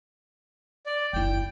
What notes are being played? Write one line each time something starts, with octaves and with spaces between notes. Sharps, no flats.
D5
F#1 E4 G5